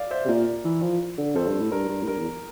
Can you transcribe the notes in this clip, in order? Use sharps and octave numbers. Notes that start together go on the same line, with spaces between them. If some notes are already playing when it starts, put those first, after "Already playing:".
Already playing: D5 F5
C5 E5
C3
A#2 A#4 D5
E3
F3
D3
F2 A4 C5
G2
A2
G2 A#4
G2
A2
G2 A#4
E2